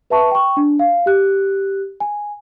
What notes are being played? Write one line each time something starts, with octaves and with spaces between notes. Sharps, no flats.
B4 E5 A5 C#6
G5 C#6
D4
F5
G4 F#6
G#5